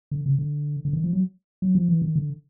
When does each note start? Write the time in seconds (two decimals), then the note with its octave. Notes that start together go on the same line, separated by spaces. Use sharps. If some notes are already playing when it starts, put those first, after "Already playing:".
0.11 D3
0.26 C#3
0.39 D3
0.85 D3
0.93 D#3
1.04 F3
1.13 F#3
1.62 F#3
1.75 F3
1.89 E3
2.02 D#3
2.16 D3